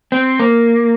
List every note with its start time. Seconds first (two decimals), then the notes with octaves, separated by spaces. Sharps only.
0.12 C4
0.39 A#3